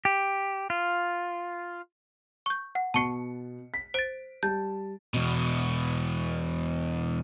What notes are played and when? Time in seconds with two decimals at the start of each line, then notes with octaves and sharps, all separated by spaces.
0.05 G4
0.70 F4
2.46 C#6 G6
2.75 F#5
2.94 B2 A5 C#6 C7 C#7
3.74 B6
3.94 C5 A6 D7
4.43 G3 A5 G6
5.14 E2 B2